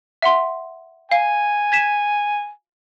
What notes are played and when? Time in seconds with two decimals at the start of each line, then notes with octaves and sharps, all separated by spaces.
0.22 E5 F#5 C6
1.12 F5 G#5
1.72 G#6 B6 E7